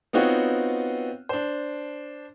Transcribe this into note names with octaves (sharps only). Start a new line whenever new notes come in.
B3 C4 D#4 F4 F#4 C#5
D4 C5